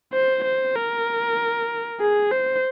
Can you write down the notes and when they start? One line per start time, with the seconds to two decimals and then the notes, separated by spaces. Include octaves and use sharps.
0.13 C5
0.44 C5
0.75 A#4
2.00 G#4
2.31 C5